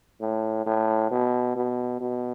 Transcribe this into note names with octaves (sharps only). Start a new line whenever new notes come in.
A2
A2
B2
B2
B2